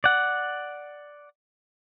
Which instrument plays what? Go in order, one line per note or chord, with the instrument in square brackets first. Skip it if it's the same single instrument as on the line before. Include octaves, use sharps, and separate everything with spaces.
[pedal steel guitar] D5 F#5